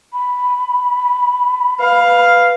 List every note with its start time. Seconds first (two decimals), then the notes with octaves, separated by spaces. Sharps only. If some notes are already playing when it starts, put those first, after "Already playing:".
0.13 B5
1.80 B4 F5